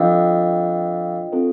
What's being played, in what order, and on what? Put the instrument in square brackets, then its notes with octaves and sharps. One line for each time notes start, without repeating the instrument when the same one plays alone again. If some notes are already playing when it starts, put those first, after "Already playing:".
Already playing: [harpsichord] F2 [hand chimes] D4 F4 C5 D#5 G5
[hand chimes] C4 F4 A4 C5